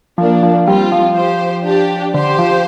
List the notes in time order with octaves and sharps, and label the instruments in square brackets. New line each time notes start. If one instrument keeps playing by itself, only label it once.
[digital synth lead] F3 [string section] A#3 D4
[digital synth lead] F3
[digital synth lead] G3 [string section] C4 F4
[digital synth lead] F3
[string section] G4 C5
D4 G4
[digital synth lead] D3 [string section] G4 C5
[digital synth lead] F3